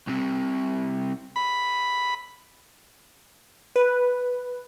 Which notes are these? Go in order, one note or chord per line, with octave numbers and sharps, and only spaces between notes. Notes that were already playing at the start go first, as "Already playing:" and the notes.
C2 C3
B5
B4